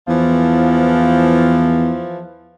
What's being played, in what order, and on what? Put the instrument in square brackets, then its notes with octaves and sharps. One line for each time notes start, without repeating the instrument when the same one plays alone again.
[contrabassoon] E2 [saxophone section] E3 F3